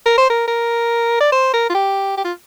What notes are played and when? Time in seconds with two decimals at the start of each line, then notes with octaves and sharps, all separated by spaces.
0.06 A#4
0.18 C5
0.30 A#4
0.48 A#4
1.20 D5
1.32 C5
1.53 A#4
1.70 F4
1.75 G4
2.17 G4
2.24 F4